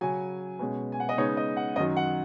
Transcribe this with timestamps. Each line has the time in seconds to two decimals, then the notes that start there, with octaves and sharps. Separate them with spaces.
0.01 C#3 F#3 C#4 G#5
0.59 B2 G#3 C#4
0.92 G#5
1.00 F#5
1.09 D#5
1.18 C#3 G#3 B3 D#4 C#5
1.37 D#5
1.57 F#5
1.76 F#2 D#3 F#3 D#5
1.97 F#5